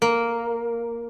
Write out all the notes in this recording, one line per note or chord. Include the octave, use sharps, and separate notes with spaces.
A#3